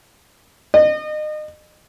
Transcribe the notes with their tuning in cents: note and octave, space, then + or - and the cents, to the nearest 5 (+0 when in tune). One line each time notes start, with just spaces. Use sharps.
D#5 -30